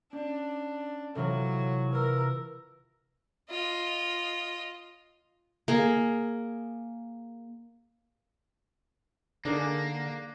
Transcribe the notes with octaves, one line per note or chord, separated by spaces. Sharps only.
C#4 D4
C3 E3 F#3 F4 A4 C#5
A#4 B4 E6
F4 D#5
A#3 G#4
D3 A#3 D4 D#4 G#4 A#4